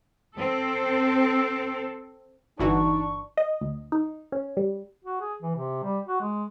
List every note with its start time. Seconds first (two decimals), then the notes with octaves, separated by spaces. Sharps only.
0.36 C4 A4
2.59 G1 E3 D4 D#4 F#4 C#6
3.37 D#5
3.61 D2
3.92 D#4
4.32 C#4
4.57 G3
5.04 F#4
5.21 G#4
5.42 E3
5.56 C3
5.84 G3
6.07 F#4
6.21 G#3